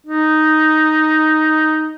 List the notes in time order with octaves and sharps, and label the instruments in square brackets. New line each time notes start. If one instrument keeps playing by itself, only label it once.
[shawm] D#4